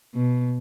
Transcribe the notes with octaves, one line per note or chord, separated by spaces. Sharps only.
B2